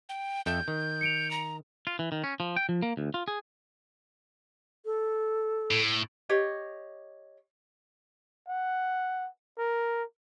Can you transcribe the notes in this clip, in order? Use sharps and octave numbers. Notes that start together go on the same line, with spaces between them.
G5
F2 A4 E5 G6
D#3
C#7 D7 F7
A#5
F4
E3
D#3
C#4
F3
G5
F3
A#3
D2
F4
G#4
A4
A2
G4 C#5 D#5
F#5
A#4